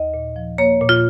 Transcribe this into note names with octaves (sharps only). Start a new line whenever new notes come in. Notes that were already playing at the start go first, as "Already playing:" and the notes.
Already playing: D#2 D#5
A#2
F3
A#3 C#5
A#2
F4